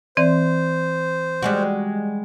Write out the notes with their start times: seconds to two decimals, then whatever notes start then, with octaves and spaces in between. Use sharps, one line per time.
0.17 E3 C4 C5 D5
1.42 G3 G#3 F#4